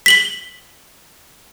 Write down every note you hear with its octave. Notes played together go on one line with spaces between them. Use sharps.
B6 F#7 G7